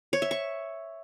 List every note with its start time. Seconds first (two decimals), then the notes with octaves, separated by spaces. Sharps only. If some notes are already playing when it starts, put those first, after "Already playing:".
0.13 C#5
0.22 E5
0.31 C#6